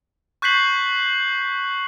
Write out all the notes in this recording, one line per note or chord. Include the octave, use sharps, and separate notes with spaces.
C#6 F#6 G6 B6 C7 F#7